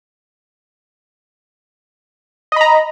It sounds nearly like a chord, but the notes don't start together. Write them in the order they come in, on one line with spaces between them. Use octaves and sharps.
D#5 B5 A#5